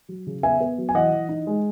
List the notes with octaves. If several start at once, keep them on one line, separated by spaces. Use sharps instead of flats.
F#3
C#3
B3 E5 G#5
B3
F#3
G#5
E3 D#5 F#5
E3
D#4
G#3